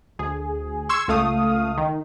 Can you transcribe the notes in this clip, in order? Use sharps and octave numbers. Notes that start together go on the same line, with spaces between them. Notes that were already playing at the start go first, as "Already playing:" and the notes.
D2 G#4
C6 C#6 E6 G#6
C#2 A3 F5 D#6
D#3